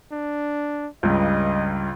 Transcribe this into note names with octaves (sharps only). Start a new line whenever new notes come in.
D4
C#2 G2 C#3 D#5